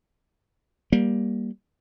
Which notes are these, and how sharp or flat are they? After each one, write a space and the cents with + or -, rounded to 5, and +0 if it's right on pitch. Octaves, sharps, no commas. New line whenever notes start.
G3 +0 A#3 +15